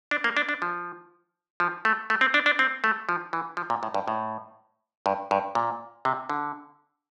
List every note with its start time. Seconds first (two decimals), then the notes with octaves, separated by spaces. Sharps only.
0.11 D4
0.24 A#3
0.37 D4
0.49 D4
0.62 F3
1.60 F3
1.85 A3
2.10 A3
2.21 C4
2.34 D4
2.46 D4
2.59 C4
2.84 A3
3.09 F3
3.33 E3
3.57 F3
3.70 A#2
3.83 A2
3.94 G2
4.08 A2
5.06 G2
5.31 G2
5.55 A#2
6.05 C3
6.30 D3